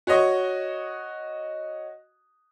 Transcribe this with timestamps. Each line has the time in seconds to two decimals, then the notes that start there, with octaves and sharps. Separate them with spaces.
0.07 F#4 C#5 D#5 C#6